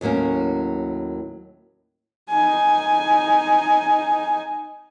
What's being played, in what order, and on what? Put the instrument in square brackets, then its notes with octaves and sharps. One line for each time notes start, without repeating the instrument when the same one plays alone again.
[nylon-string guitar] D#2 A2 F#3 A#3 C#4
[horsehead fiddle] D#4 G#5